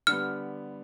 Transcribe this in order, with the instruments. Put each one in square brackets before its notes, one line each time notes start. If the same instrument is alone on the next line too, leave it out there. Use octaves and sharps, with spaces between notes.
[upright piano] D3 G3 B3 [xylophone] F6